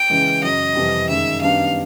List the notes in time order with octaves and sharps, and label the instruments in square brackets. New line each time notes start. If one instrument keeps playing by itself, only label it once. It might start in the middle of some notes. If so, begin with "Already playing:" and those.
Already playing: [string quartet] G5
[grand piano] C#3 E3 G#3
[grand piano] F#2 C#3 F#3 [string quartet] D#5
[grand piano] F2 C3 E3 G3
[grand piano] F#2 D#3 G#3 [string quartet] E5
[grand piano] F#2 D#3 G3 B3 D4 [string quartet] F5